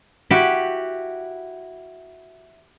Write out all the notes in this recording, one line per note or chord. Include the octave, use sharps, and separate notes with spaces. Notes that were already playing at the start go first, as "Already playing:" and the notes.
E4 F#4 G4